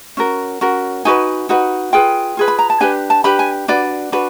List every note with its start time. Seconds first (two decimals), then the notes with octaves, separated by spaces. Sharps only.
0.17 C#4 F#4 A#4
0.61 C#4 F#4 A#4
1.05 D#4 F#4 B4 G#5
1.49 D#4 F#4 B4
1.93 F4 G#4 B4 G5
2.37 F4 G#4 B4
2.48 B5
2.59 A#5
2.70 A5
2.80 D4 G4 B4 G#5
3.10 A5
3.24 D4 G4 B4 B5
3.39 G#5
3.68 D4 F#4 B4 D5
4.12 D4 F#4 B4